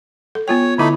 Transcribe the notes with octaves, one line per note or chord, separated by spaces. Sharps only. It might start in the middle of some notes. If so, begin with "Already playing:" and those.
A4
B3 F4 C#5 G5
D3 A3 D#4 E4 B5